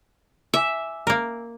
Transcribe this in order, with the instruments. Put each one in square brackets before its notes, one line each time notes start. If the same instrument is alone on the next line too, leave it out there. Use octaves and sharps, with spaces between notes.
[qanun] E5 [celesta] G#5 D6 E6
[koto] A#3 A#4